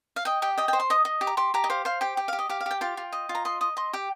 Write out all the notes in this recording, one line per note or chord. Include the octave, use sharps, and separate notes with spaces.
F5
D#5 G5
G4 G5
D#5 G5
C5 G5
C6
D#5 D#6
D#5
G4
A#5
G4 C6
G4 A#5
D#5
C5 F5
C5 F5
G4 G5
G4
G4 F5
D#5
G4 F5
F5
G4 G5
F4 G5
F4
D#5
F4
A#5
D#5 C6
D#5 D#6
D#5 C6
G4 G5